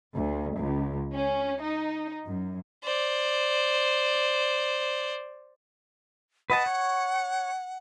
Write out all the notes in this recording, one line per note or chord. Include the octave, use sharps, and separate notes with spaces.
D2
C#2
C#4
D#4
F#2
C5 D5
B4 D#5 F#5 A5
C#5